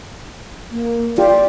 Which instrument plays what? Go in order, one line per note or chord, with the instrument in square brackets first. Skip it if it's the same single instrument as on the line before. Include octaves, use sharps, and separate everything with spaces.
[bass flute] A#3
[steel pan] F4 G4 [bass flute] D5